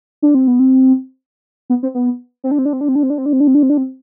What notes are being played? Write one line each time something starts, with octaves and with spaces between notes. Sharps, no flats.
D4
C4
B3
C4
B3
C4
B3
C4
D4
C4
D4
C4
D4
C4
D4
C4
D4
C4
D4
C4
D4
C4
D4
C4
D4
C4